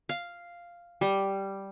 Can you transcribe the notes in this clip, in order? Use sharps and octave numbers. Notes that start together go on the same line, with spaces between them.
F5
G3